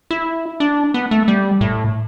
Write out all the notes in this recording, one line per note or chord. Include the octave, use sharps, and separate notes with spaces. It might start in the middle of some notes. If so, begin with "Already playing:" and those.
E4
D4
B3
A3
G3
A2